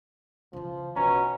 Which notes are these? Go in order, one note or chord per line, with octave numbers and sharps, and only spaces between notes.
C#3 E3 F3
B1 B2 C#4 A#5